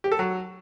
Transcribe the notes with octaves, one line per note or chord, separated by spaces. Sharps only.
G4
A4
F#3